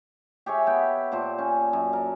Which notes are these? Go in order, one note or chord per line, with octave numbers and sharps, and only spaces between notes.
G4 G#4 C#5 E5
B3 B4 G5
A#2 C5 A5
C#4
F#2
A#4 A5